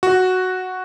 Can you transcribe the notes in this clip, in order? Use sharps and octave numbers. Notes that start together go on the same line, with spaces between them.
F#4